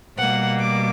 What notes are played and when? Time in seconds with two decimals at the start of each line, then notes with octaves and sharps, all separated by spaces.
0.16 B2 G3 A#3 F#5
0.59 D6